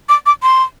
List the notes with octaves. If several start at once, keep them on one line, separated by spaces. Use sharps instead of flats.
D6
D6
C6